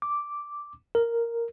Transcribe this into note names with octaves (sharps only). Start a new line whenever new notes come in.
D6
A#4